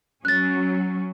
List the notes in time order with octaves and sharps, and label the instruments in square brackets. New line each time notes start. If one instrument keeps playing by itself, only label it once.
[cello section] F#3 C#4 [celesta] F#6 A6